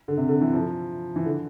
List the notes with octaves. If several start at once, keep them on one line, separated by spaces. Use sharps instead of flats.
D3
C3
D3
E3
F3
E3
D3